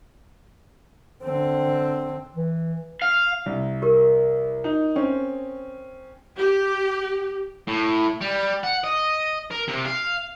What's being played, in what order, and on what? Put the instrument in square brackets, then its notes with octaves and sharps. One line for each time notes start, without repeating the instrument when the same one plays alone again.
[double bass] D3 C4
[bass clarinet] E3
[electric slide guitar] F5
[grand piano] C2
[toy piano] G4 A#4
[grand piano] D#4
C4 C#4
[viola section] G4
[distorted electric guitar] A2
G3
F#5
D#5
A#4
C3
F5